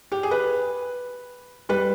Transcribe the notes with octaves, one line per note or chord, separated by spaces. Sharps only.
G4
G#4
B4
G3 B4